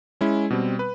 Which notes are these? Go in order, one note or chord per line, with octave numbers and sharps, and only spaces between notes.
G#3 C#4 E4
B2 G3 C4
B4